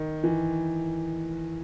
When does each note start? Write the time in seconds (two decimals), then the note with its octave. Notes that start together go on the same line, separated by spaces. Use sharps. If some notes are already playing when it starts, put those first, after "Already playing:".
Already playing: D#3
0.24 E3